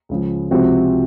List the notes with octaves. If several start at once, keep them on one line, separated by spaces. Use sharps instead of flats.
C#2 C#3 F3
C#2 C3 F3 C4 F#4